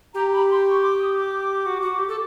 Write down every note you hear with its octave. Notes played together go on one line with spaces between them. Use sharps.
G4 A#5
B5
C6
C#6
D6
D#6
D6
F#4
F#4
G4
A4